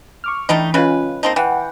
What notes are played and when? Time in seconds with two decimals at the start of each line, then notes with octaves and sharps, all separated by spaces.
0.24 C#6 D6 F6
0.49 E3 A3 D4 D#4 G5 B5
0.74 C#3 G#3 C#4 F4 B4
1.23 A#3 C4 D#4 A5
1.36 E3 F#5 G5